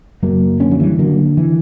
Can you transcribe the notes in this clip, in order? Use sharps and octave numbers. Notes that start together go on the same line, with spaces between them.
F#1 F#3 A#3
D3 A#3 C#4
F#3
E3 G3
D3 F#3 A#3
E3